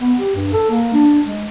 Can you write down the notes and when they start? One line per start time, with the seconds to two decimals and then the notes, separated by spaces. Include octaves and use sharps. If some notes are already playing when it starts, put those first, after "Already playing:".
0.01 B3
0.19 G4
0.35 G2
0.53 A4
0.71 A#3
0.94 D4
1.26 G#3